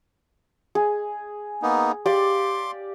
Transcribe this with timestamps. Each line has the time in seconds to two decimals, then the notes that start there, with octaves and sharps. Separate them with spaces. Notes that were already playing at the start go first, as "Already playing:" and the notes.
0.75 G#4
1.62 A#3 B3 D#4
2.06 G4 D5 F5 C6 D6